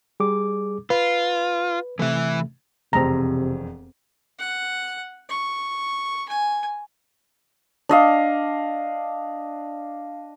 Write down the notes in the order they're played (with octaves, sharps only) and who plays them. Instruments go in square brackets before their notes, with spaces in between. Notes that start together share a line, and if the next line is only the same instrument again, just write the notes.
[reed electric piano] G3 G#4 D6
[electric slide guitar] F4 [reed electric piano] B4
[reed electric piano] C3 A3 [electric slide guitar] E3 E5
[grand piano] E1 F2 [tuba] C3 [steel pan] C4 A#5
[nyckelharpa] F#5
C#6
G#5
[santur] D4 D#5 F5